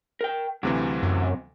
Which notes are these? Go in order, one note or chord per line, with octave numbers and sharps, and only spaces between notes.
A#4 G5
D2 C3 E3 F#3 C4
F#2